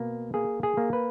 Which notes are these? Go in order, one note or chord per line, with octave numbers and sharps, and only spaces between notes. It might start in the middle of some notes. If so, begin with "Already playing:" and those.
Already playing: B2 A#3
A#3 G#4
G#4
A#3
B4